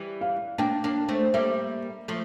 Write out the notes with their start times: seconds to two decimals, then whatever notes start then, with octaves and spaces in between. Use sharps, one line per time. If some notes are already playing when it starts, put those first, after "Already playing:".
Already playing: E3 G3
0.21 F5
0.58 A#3 D4 G5
0.84 A#3 D4
1.09 A3 C4
1.34 G3 A#3 E5
2.08 F3 A3